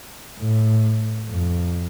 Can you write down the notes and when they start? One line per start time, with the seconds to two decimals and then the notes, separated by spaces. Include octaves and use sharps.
0.38 A2
1.29 F2